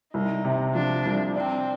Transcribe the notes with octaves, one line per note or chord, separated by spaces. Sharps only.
C2 D#4
C3
F3 D4
C2
C4 D4